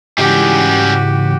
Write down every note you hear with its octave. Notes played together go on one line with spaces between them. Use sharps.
G#2 C#3 E3 G3 C#4 F#4 G4